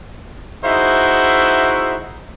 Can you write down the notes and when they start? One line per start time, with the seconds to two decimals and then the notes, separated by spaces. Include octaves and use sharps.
0.65 D#4 E4 F#4 G#4 C5 E5